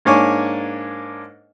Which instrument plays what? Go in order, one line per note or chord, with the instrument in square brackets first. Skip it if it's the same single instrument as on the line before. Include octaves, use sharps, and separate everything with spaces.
[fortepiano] G#2 A#3 D4 C#5 G#5